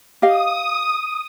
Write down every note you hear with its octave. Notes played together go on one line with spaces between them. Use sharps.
G4 D#5 F5 D#6